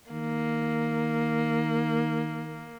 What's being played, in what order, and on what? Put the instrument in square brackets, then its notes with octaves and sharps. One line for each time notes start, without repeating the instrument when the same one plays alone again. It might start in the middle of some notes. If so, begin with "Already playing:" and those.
[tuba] D#3 [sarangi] A#3